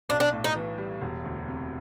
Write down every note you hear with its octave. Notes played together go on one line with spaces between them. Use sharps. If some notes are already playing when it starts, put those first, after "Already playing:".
B1 D4
D4
A2
D#4
E3
G3
E1
D2
C3